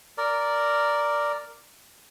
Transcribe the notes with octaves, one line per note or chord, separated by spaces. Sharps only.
A#4 D5